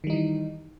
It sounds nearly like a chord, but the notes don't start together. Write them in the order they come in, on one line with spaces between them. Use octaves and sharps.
D#3 G3 D#4 E3